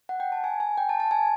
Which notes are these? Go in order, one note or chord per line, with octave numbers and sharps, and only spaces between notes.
F#5
G5
A5
G#5
G#5
G5
A5
A5
G#5